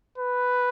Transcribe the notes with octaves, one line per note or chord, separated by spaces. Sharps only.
B4